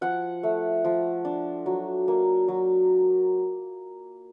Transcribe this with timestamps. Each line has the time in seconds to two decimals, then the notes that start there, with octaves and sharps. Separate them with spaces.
0.01 F3 F#5
0.43 A3
0.84 F3
1.25 D4
1.66 F#3
2.08 A#3
2.48 F#3